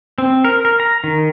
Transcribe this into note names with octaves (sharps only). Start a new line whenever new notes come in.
C4
A#4
A#4
A#5
D#3